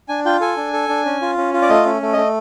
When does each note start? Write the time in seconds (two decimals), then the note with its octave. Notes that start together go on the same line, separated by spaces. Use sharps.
0.09 D4 G#5
0.25 F4 G5
0.41 A4 G#5
0.57 D4
0.73 A4
0.89 D4
1.05 C#4
1.22 F4
1.38 C#4
1.54 F4
1.62 D5
1.69 A3 D#5
1.85 C#4
2.02 A3
2.13 A3 D#5